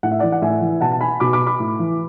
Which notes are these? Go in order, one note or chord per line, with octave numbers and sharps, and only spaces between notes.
A2 F#5
E5
E3 D5 F#5
F#5
A2 E5 G#5
E3
B2 F#5 A5
A5
G#5 B5
B2 B5 D6
B5 D6
B5 D6
A2
E3